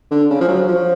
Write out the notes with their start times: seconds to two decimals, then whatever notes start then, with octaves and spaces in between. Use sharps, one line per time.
0.11 D3
0.30 C#3
0.41 F3
0.48 F#3
0.68 F3